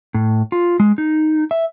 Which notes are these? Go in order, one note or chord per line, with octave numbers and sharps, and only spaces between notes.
A2
F4
G#3
D#4
E5